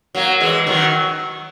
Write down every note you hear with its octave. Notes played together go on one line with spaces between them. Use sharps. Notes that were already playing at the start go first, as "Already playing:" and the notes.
F#3 A#3
E3 G#3
D#3 F#3